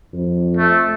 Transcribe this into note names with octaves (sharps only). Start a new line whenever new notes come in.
F2
A3